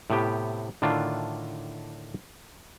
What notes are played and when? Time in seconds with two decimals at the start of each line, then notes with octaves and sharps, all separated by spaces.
0.10 A2 C3 B3 G4
0.82 A2 D3 D#3 D4 F4